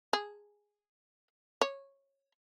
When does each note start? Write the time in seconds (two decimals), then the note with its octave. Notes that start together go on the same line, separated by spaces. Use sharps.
0.13 G#4
1.61 C#5